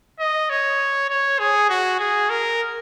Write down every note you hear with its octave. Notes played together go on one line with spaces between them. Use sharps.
D#5
C#5
C#5
G#4
F#4
G#4
A#4